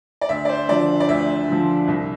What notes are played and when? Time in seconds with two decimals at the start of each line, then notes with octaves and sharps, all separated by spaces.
0.21 D5
0.29 D2 E5
0.45 D5
0.49 C5
0.68 D3 F3 D5
1.00 D5
1.09 D2 E5
1.48 D3 F3
1.88 C2